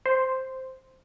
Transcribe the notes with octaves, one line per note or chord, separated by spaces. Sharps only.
C5